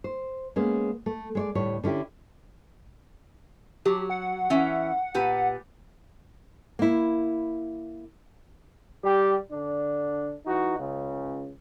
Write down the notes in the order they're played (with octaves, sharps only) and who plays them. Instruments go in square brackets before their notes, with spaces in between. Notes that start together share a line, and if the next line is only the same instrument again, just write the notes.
[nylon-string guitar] C5
G#3 A#3 B3 C#4
A3
G#3 C#5 D5
D2 A2 G3 C#5
D3 C#4 E4 G4
[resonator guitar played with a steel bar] F#3 [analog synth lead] G4
[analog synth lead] F#5
[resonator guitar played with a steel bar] E3 C#4 E5
A#2 G4 B4
[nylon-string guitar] A#3 E4
[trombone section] G3 G4
D3 D4
E3 D#4 F#4
C#2 C#3